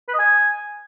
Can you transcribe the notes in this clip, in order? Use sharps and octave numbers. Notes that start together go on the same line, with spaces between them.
B4
D#5
G#5